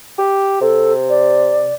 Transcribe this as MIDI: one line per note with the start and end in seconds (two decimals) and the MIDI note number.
0.18 0.56 67
0.61 1.75 48
0.61 0.93 69
1.09 1.74 74